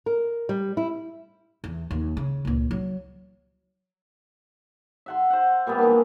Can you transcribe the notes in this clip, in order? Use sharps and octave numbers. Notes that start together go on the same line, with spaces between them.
A#4
G3
E4
E2
D#2
C#3
C#2 A#2
F#3
E5 F#5 C6
C5 F#5
A#2 G3 A#3 B3
E3 G#3 A#3 D4